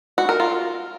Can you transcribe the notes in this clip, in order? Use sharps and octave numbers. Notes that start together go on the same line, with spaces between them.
F#4
A#4
F4